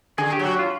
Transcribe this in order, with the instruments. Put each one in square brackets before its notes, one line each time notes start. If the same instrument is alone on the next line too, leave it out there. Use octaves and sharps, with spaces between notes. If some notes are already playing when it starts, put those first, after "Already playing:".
[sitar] D3 [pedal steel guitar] G#4
[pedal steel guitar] G4
[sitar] F#3
[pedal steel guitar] F#4
F4